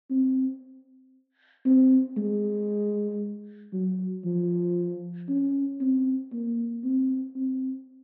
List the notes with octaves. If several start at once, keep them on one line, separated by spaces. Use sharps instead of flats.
C4
C4
G#3
F#3
F3
C#4
C4
A#3
C4
C4